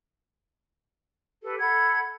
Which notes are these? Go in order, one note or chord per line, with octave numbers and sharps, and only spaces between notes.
G4 A4 B4
A4 F#5 B5 G#6